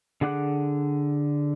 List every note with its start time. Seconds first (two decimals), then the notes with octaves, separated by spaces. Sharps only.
0.21 D3 G#4 F#5 D6 F#6